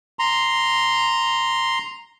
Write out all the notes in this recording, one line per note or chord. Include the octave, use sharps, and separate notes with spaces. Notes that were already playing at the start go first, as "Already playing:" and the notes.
A#5 C6